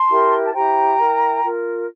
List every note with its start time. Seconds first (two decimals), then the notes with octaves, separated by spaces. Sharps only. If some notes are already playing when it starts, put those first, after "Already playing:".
Already playing: A5 C6
0.08 E4 G4 A#4
0.46 A5
0.53 E4 G4 C5 G5 A#5
0.97 E4 A#4
1.42 F4 A#4